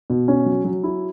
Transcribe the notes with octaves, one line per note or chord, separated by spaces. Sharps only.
B2
C#4
F#3
F#3
E4